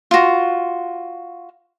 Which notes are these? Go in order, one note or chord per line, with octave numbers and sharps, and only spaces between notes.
F4 F#4